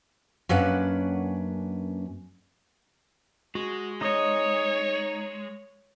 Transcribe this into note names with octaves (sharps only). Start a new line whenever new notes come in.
F#2 A#3 C#4 D4 B4 F#5
G#3 F#4
D#4 C#5 D#5 D#6